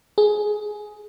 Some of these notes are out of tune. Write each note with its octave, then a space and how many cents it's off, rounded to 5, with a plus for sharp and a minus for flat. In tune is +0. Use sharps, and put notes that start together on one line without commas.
G#4 +15